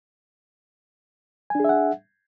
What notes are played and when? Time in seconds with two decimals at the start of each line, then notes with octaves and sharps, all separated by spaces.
1.50 G#5
1.55 D4
1.60 G#4
1.64 E5
1.69 F#5